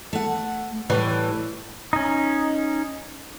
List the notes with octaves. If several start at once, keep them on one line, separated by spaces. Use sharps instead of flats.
A3 F#5
A2 E3 G3
C#4 D#4